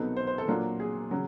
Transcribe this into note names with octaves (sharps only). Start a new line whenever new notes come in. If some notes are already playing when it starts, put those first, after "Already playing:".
Already playing: C2 B2 F#3 B3 D#4 A4
C5
C5
A4
A#2 F#3 A#3 D4 F4
G#4
C#3 F#3